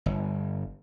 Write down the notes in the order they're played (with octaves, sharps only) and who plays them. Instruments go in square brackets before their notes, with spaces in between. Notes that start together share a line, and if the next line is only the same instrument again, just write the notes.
[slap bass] G1